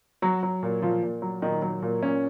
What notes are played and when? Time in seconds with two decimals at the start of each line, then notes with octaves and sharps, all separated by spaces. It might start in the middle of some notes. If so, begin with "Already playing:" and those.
0.22 F#3 F#4
0.43 F#3
0.63 A#2
0.82 A#2 F3 F4
1.03 A#2
1.22 F#3
1.42 A#2 D#3 D#4
1.62 F#3
1.82 A#2
2.02 A#2 C#4